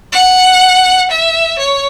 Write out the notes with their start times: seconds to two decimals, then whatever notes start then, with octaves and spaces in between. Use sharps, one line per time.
0.12 F#5
1.11 E5
1.59 C#5